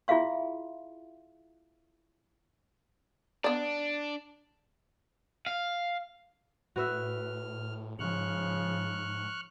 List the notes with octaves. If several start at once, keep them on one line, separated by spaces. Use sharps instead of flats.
E4 F4 G#4 E5 F5 C6
B3 D4 D5
F5
A2 F#4 B4 E5 F6
G#2 C#3 F3 C#6 F6 F#6